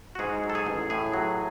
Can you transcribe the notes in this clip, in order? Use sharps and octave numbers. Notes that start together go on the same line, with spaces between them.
F#4
G#2 G#4
F#3
A4
G#4
A1
A2 G#4
F#3